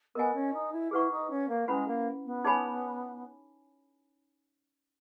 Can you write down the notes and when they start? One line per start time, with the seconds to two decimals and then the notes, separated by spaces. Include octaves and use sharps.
0.15 B3 A#4 D#5 G#5
0.34 C#4
0.53 D#4
0.73 E4
0.91 E4 G#4 B4 F#5 C#6
1.11 D#4
1.30 C#4
1.48 A#3
1.67 G#3 C#4 E4 B4 F#5 B5
1.87 A#3
2.25 B3
2.44 D#4 G#4 C#5 G#5 B5